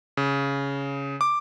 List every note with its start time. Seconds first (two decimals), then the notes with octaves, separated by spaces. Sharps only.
0.17 C#3
1.21 D6